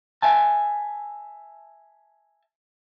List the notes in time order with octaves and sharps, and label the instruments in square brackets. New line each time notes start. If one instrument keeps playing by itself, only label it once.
[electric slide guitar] E5 G#5 A5